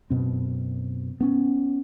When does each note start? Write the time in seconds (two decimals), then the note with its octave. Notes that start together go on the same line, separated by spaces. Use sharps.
0.10 F#2 B2 C4
1.20 B3 C#4